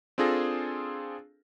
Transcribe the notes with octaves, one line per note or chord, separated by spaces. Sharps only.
C4 D4 F4 G#4 A4 A#6